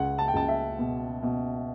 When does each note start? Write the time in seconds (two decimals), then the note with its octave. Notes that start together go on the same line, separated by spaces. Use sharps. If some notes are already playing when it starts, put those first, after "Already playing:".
Already playing: C#2 F#5
0.18 A5
0.28 G5
0.33 C#2 A5
0.48 E5
0.79 B2
1.23 B2